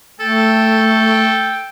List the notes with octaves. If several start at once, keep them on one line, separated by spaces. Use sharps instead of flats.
A3 A4 G5